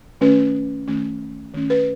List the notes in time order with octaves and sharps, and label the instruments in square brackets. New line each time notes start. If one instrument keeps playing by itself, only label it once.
[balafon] D#3 A3 C#4 B4
D#3 A3 C#4
D#3 A3 C#4
B4